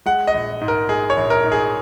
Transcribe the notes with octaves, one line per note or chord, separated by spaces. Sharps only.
G#3 F#5
D#5
A#1
G#2
A#4
G#2 G#4
C#5
A#1
A#4
G#2
G#4